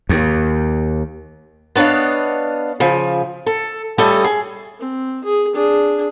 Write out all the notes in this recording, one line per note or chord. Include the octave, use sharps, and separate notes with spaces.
D#2
B3 D4 C#5 D#5 F5
C#3 F3
A4
G3 A3 C#4 A4 D#5 G5
G#4
C4
G#4
D4 G#4